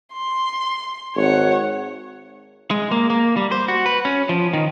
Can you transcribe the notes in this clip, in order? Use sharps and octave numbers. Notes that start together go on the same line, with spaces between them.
C6
G#1 C#5 F#5
G#3
A#3
A#3
G3
C5
F#4
B4
C#4
F3
D#3